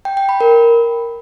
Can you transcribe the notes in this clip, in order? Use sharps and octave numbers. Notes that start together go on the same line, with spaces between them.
G5
G5
B5
A#4